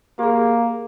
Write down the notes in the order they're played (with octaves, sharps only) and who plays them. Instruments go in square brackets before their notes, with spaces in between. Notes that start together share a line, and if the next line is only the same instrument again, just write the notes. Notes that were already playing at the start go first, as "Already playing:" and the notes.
[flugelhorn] A#3 [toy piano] G4 G#4